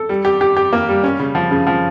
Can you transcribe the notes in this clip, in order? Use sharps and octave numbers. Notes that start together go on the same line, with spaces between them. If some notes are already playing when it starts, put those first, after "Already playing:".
Already playing: A4
G3
G4
G4
G4
A#3
G3
C#4
C#3
F3
C#3
F3